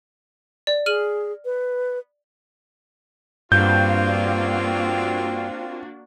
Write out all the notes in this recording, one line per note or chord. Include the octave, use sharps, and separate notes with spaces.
D5
G#4 F6 D#7 F#7
B4
G2 A#3 C4 D4 F4 F#4 G6